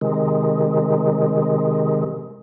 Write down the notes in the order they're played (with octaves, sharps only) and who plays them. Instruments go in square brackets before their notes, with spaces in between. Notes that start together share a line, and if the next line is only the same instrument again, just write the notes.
[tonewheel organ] C3 D#3 G#3